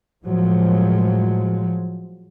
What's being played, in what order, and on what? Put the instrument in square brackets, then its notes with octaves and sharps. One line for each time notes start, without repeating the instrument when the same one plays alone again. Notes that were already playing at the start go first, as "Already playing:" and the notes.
[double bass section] A2 F3 F#3 G#3